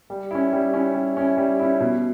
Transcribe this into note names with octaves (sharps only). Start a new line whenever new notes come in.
G3
C#4 E4
G3
C#4 E4
G3
C#4 E4
G3
C#4 E4
B2